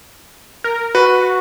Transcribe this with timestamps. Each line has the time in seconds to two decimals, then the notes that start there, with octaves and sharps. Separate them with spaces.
0.64 A#4
0.95 F#4 B4